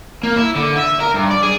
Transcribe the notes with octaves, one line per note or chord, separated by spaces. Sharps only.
A#3
E4
D3
E5
A#4
G2
D5
G#4